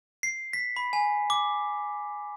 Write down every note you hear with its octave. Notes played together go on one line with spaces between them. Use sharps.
C7
B6
B5
G#5
D6